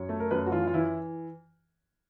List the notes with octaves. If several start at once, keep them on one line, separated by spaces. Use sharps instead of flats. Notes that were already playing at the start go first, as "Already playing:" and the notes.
Already playing: F#2 C#5
A3
A#4
F#2 B4
F#4
E3 F4
F4
E3 E4